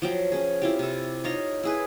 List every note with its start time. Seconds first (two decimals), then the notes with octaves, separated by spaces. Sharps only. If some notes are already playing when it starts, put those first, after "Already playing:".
0.02 F3 F#3 G5
0.32 C#4 G#4
0.62 C4 E4 F4 G4
0.79 C3 A4
1.24 D#4 F4 C#5 D#5
1.63 E4 G#4 B4